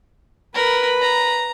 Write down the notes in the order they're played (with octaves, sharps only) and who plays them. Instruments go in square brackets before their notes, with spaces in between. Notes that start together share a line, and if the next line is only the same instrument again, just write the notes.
[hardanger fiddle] A#4 [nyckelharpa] B4 B5
[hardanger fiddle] A#5